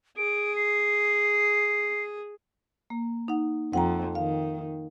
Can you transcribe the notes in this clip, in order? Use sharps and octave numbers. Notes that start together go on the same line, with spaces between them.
G#4 D7
C7
A#3
D#4 F#5
F2 F#5 G5 A#5
D#3 F5